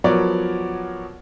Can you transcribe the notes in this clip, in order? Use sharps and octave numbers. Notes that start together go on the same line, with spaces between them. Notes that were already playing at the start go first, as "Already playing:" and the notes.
F3 F#3 B3 A#4 C#5 D5